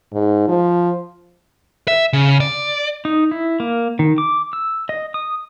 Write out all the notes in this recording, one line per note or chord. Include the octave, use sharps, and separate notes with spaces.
G#2
F3
E5
C#3
D5
D#4
E4
A#3
D#3
D6
E6
D#5
D#6